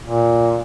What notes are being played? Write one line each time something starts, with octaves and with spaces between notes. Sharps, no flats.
A#2